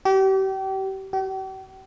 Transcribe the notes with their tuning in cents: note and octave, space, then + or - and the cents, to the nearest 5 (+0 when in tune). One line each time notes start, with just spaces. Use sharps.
G4 -35
G4 -45